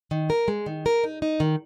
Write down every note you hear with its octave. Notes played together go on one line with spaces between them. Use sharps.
D#3
A#4
G#3
D#3
A#4
D#4
D#4
D#3